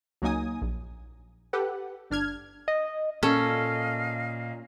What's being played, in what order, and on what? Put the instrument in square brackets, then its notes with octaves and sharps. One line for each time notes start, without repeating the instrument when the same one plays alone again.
[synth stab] C#2 F#3 A#3 D#4 G#5 D#6
A#1
G4 A4 B4 F#5
G1 D4 F6 G#6
[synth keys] D#5
[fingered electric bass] A#2 [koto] C#4 [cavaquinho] A4 [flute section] D#5 F5